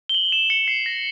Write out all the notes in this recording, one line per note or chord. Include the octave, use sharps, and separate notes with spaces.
G7
F#7
E7
C#7
C7
A#6